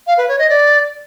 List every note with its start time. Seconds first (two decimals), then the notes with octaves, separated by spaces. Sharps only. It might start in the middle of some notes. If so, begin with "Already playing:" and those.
0.07 F5
0.18 B4
0.28 C#5
0.39 D#5
0.49 D5